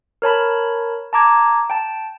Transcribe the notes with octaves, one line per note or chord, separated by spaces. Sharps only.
A#4 C#5 A5 B5
A5 A#5 D6 G#6
G5 A5